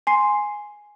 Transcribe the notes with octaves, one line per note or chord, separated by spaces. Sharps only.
G#5 C6 C7